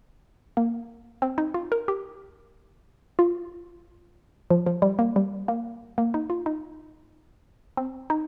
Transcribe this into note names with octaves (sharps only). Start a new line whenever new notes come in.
A#3
C4
D#4
F4
A#4
G4
F4
F3
F3
G3
A#3
G3
A#3
A#3
D#4
F4
D#4
C4
D#4